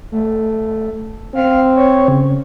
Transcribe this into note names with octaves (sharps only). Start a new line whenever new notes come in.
A3
C4 F5
C#5
C#3